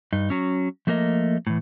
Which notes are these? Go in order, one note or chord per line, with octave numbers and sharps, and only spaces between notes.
G2 D#4
F#3 C#4
F3 A3 A#3 A#4 D#5
A2 E3